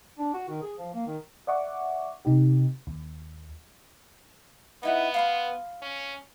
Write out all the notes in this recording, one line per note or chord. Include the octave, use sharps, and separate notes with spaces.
D4
F#4
D#3
G#4
F3
A#3
D#3
D5 E5 F#5 C#6 D6
C3 D#4 G4
D#2
B3 D#4 E4 F#5
F5 B5 C6
C#4